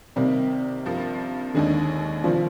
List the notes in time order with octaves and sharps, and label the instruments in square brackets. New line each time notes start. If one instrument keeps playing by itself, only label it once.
[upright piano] C3 [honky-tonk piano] D#3 G3 A#3 D#4 G4
[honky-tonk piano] G2 F3 A#3
[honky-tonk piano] D#2 D3 G#3 D4 G#4 [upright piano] D#3
[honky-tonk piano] C3 D#3 G3 [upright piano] F3